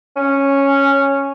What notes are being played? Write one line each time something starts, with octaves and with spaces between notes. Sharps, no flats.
C#4